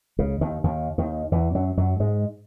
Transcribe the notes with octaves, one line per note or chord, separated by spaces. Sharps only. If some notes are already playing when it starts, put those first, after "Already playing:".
C#2 C#3
D#2 D#3
D#2 D#3
D#2 D#3
E2 E3
F#2 F#3
F#2 F#3
G#2 G#3